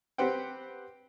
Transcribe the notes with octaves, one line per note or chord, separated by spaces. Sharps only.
C4 G4 B4 C5 F#5 G5